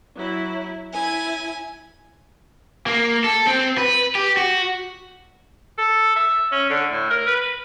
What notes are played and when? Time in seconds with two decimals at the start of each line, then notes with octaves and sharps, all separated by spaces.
0.16 F#3 E4
0.94 E4 G#5
2.86 A#3
3.24 A4
3.47 C4
3.78 B4
4.15 G4
4.37 F#4
5.78 A4
6.16 E5
6.52 C#4
6.70 D3
6.91 A2
7.10 A#4
7.27 B4